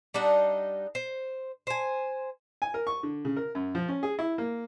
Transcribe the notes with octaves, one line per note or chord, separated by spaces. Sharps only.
G3 D4 D#4 F#5
C5
C5 G#5
G#5
A#4
C#6
D3
C#3
A#4
F#2
F3
C#4
G#4
E4
A#3